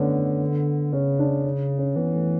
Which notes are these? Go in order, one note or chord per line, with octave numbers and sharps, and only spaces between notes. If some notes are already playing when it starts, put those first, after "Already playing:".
Already playing: D3 A3 B3 C#4 D4
C#3 C#4
D4
C#4
C#4
E3 B3
A3